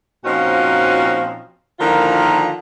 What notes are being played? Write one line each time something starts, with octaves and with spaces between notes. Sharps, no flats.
A#2 F3 C4 C#4 D#4 F#4
D3 D#3 F3 A#3 E4 F4